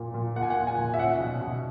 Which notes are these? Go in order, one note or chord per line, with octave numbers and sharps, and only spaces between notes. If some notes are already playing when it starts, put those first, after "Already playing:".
Already playing: A#2 A#3
A#2
A#3 F#5
G#5
F#5
A#2
G#5
A#2
E5
C#4 F#5
B2
B2